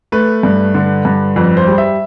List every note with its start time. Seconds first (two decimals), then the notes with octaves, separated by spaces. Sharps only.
0.12 A3 B4
0.43 G2
0.74 D3
1.05 G2
1.36 F2 B4
1.57 C5
1.68 G3
1.78 E5